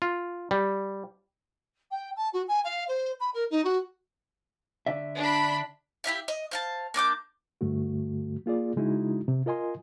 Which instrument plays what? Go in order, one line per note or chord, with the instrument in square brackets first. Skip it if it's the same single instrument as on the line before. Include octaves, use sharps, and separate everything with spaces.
[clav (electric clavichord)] F4
G3
[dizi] G5
A5
F#4
G#5
F5
C5
B5
A#4
D#4
F#4
[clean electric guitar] D3 D5 E5
[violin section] D4 B5
[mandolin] E4 G4 E5 F5
D#5
C5 F5 A5
A#3 D4 D6 G6
[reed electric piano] G2 D3 A3 F#4
A#3 F4 G#4 D5
C#3 G#3 D#4 E4 F#4
C3
F4 A#4 D#5 G#5 C6